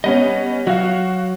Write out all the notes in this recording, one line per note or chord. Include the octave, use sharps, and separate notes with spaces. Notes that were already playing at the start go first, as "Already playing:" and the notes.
G3 B3 C#4 D#5
F#3 F#4 F5